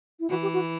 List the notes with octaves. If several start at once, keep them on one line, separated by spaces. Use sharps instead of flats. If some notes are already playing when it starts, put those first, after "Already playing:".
E4
E3 F#4
G4
F#4